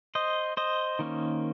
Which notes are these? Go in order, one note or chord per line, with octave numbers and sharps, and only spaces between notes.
C5 D#5
C5 D#5
D#3 A#3 C#4